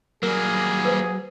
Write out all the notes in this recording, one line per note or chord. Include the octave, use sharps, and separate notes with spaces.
F#3 G3 A#3 G#4 A#4
B4 C5